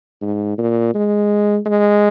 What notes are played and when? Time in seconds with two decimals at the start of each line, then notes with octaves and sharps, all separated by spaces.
0.22 G#2
0.58 A#2
0.94 G#3
1.66 G#3